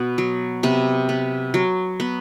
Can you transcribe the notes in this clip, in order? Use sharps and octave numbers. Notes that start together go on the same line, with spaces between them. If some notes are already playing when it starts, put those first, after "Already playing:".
Already playing: B2 B3
F#3
C3 B3
B3
F#3
B3